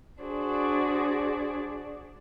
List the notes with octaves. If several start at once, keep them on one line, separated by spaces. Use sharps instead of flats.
D4 F#4 G#4 C5 D5